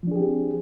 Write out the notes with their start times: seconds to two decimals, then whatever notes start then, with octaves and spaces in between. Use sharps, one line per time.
0.03 F3
0.07 D4
0.11 G#4
0.16 G4
0.20 C4